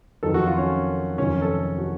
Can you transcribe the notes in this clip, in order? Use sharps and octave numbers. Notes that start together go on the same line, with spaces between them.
F2 D#3 F#3 A4
F#4
F4
C#4
F1 F2 C3 D#3 F#3 C#4
A4
F#4